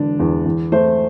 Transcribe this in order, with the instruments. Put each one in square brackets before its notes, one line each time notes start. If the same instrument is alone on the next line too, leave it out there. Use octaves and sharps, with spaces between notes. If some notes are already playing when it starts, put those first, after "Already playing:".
Already playing: [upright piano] E1 D3 D4
E2
E2
A3 C5